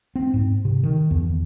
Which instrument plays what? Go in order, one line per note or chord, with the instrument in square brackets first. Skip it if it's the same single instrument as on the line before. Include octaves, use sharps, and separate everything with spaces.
[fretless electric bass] C4
G#2
C3
D#3
E2